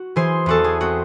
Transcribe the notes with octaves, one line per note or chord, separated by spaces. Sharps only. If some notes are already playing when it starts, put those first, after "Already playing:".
Already playing: F#4
E3 G#4 C5
E2 F#4 A4
G#4
C4 F#4